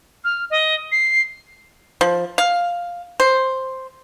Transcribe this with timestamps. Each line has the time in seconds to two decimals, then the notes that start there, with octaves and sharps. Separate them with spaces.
0.24 F6
0.50 D#5
0.92 C7
2.01 F3
2.38 F5
3.20 C5